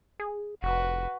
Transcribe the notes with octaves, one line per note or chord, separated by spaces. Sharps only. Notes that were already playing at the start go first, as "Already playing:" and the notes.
G#4
F1 F#4 B4